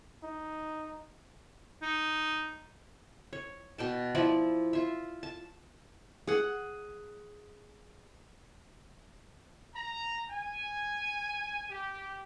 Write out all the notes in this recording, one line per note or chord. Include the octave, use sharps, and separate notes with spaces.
D#4
D#4
C#5
B2 G5 A5
F3 E4 D5 E5
F4 E5
A5
G#4 F#5
A#5
G#5
G4